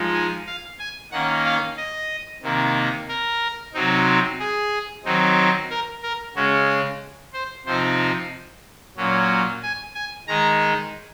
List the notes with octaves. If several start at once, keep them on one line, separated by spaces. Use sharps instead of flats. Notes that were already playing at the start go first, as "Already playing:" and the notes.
Already playing: F3 G#3 D#4
G#5
F5
G#5
D#3 A#3 C#4 F#5
F5
D#5
C3 D#3 A#3
A#4
C3 F#3 C4 D#4
G#4
D#3 F#3 C4 D#4
A#4
A#4
C#3 G#3 C#4 F#4
G#4
C5
C3 F3 C4 D#4 C5
A#2 F#3 C#4
G#5
G#5
D#3 G#3 D#4 A#5